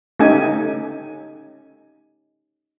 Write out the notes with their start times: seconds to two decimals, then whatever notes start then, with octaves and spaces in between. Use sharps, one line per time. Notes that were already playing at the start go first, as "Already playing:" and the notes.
0.20 A3 C#4 D#4 G4 G#5